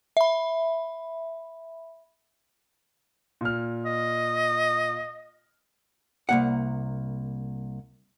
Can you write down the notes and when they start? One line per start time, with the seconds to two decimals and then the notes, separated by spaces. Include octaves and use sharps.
0.17 E5 B5
3.41 A#2 F6
3.86 D#5
6.29 C2 A#3 F#5